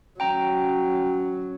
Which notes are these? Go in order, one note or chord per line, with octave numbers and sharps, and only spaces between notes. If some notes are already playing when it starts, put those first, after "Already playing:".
F#3 C#4 G5 A#5